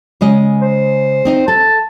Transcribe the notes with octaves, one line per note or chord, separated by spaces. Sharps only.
C#3 G#3 D#5
C5
C4 D#4 D#5
A4 A5